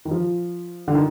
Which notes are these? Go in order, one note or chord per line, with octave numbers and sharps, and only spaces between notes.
D#3
F3
D3
D#3